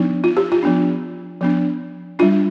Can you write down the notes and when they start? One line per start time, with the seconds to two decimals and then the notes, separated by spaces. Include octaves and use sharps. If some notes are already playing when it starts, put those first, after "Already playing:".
Already playing: F3 B3 D4 D#4
0.24 F4
0.37 G4
0.52 F4
0.63 F3 B3 D4
1.41 F3 B3 D4
2.19 G3 D4 F4